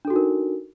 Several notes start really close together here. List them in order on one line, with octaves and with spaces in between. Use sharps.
D4 A4 F#4 D#4 A#4